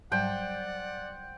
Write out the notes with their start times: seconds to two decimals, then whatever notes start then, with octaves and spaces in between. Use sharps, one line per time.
0.12 G#2 F#3 G3 C5 D5 F#5 G5